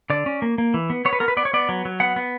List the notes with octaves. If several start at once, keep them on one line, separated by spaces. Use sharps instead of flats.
D3 D5
C#4
A#3
A#3
E3
B3
B3 C#5
B4
B3 A#4
B4
B3 D5
C#5
B3 D5
F#3
F#3
B3 F#5
B3